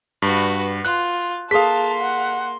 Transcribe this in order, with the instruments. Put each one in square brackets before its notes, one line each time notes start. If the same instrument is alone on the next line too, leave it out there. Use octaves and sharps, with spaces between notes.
[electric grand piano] G2 [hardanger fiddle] F#4 B4
[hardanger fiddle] F4 [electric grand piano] F#6
[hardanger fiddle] A#3 C6 [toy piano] G#4 A4 [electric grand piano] F5 B6 [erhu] A5
[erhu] F#5